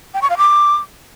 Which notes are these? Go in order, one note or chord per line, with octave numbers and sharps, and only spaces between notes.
G5
C#6
F5
D6